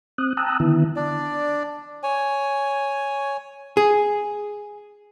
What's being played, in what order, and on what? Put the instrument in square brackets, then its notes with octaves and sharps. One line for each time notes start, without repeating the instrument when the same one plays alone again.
[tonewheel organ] C4 D#6 F#6
G5 A5 A#5 D#6 E6 F#6
D3 D#3 B3 E4
[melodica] D4 D5
C#5 G#5
[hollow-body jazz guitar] G#4